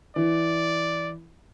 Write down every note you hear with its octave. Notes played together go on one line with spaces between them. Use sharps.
E3 D5